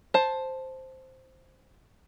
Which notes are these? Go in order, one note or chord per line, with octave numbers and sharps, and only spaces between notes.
C5 A5